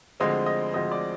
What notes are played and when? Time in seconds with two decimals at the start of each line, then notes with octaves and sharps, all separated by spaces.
0.20 D2 D3 F3 G#3 C4 D#5
0.46 D#5
0.73 D2 D3 F3 G#3 C4 D#5
0.92 D5